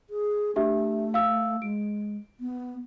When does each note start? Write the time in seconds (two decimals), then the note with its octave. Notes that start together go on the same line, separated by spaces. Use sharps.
0.10 G#4
0.56 A3 D4 G4 E5
1.14 F5 E6
1.62 G#3 D7
2.40 B3